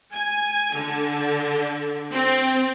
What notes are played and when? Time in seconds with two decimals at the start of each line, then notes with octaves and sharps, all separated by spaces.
0.13 G#5
0.75 D3
2.12 C4